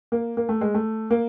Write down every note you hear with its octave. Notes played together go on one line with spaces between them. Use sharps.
A#3
A#3
A3
G#3
A3
A#3